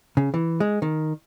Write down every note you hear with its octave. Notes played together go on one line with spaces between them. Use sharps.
C#3
E3
G#3
D#3